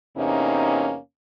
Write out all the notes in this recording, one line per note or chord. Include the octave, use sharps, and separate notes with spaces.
E2 C3 A#3 C#4 D#4